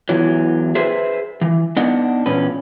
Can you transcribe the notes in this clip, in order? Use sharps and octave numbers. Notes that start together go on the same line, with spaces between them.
E2 E3 F#3
G#4 B4 C5 E5
E3
B3 D4 D#4 D#5 F#5
E2 A#2 C#4 B4